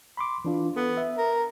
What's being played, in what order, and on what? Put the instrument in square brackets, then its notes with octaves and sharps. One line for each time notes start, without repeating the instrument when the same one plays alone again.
[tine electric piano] B5 C6 D6
E3 D4 F4
[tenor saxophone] B3 [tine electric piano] A4
[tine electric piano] E5
[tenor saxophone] A#4